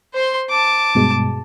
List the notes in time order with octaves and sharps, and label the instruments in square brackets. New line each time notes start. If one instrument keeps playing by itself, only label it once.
[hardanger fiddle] C5 C6
A5 D6
[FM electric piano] G2 B2 G#3